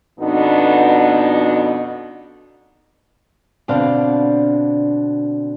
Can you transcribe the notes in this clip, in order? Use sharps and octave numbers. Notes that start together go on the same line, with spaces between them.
F2 B2 B3 D4 D#4
B2 D3 C4 D4 F5